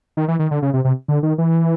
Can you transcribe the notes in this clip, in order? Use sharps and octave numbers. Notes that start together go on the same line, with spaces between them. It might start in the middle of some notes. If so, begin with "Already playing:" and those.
D#3
E3
D#3
D3
C#3
C3
C3
D3
D#3
E3